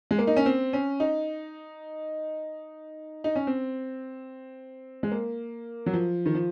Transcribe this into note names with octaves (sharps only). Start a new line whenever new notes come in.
G#3
A#3
D#4
C#4
C4
C#4
D#4
D#4
C#4
C4
G#3
A#3
F#3
F3
D#3
F3